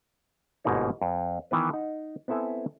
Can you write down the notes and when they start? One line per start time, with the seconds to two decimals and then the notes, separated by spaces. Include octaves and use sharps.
0.64 G1 G#2 B2 A#3 D#4 C#5
1.01 F2
1.51 D#3 E3 B3 B4
1.73 D#4 F#5
2.28 B3 C4 E4 A4 E5 G#5